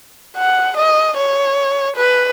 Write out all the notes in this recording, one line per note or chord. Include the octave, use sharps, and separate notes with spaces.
F#5
D#5
C#5
B4